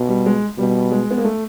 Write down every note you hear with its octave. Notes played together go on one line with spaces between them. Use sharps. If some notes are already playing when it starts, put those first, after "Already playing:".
Already playing: B2
G3
G#3
B2 G3
G#3
B3
A#3
A3